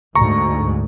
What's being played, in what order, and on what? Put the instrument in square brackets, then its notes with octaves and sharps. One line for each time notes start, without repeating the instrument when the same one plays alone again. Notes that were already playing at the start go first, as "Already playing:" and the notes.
[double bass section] D2 G#2 [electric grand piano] A#5 C#6